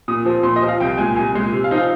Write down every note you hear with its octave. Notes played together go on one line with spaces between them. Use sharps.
A#2 D#6
F3 C4
A#2 C6
D#5
F3 C4
F5
C2 G5
A#2 G#3 G#5
C2 G#5
A#2 G#3
C3
F5
F3 C4 D#4
F5